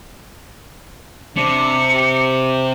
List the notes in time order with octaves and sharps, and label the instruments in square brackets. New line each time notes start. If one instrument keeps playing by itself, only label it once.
[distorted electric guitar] C3 [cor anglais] D4 [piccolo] C#7
[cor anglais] G4